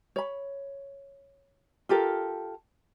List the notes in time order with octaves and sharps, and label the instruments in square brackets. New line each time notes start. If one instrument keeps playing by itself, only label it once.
[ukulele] C#5 B5
F4 G4 A4 A#4